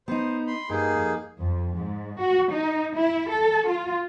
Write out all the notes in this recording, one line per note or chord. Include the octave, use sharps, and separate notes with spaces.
B3 D#4 C5
B5 C6
G2 A#3 D#4 G#4
F2
F2
G#2
F#4
D#4
E4
A4
F4